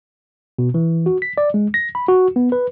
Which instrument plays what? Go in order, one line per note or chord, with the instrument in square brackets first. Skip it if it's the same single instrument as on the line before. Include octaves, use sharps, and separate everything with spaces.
[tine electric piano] B2
E3
F#4
B6
D5
G#3
A#6
B5
F#4
B3
B4